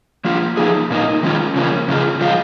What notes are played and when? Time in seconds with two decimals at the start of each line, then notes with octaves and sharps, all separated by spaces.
0.25 F3 A#3 F4
0.57 F3 A#3 D#4 G#4
0.91 A#2 A#3 D#4
1.23 D#3 G#3 C#4 F4
1.56 C#3 F3 A#3 C#4
1.88 F2 C#3 G#3 F4 G#4
2.21 F3 G#3 F4